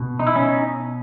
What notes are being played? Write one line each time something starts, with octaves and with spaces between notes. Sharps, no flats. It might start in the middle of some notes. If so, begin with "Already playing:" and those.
Already playing: B2
D#4
E4
C#4 D#4